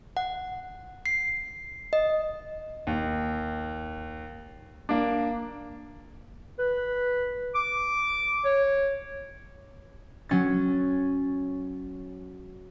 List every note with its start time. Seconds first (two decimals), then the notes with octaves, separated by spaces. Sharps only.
0.17 F#5
1.06 C7
1.93 D#5
2.87 D#2
4.89 A#3 D4
6.59 B4
7.55 D6
8.45 C#5
10.29 F#3 C#4 A6